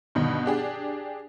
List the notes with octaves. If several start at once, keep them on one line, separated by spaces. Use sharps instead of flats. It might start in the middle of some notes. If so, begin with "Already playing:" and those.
G2 B2 D3 D#3
D4 G4 G#4